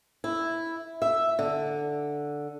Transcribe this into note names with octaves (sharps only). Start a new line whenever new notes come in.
E4
E5
D3